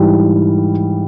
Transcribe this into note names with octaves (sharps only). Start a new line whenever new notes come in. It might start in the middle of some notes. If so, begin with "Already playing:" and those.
Already playing: G#2 E3 G3